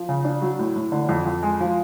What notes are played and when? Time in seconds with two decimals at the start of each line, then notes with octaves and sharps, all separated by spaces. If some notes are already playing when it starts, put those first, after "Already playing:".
Already playing: F3
0.09 C#3
0.25 D4
0.42 F#3
0.59 A2
0.76 A2
0.92 D3
1.09 F2
1.26 F2
1.43 G#3
1.61 F3